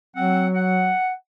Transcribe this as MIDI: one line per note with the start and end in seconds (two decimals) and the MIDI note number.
0.16 0.93 54
0.16 0.47 60
0.16 0.47 78
0.55 1.12 78